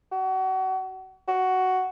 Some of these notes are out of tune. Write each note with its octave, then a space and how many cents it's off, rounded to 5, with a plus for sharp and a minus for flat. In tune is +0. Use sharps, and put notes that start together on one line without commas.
F#4 +35
F#4 +10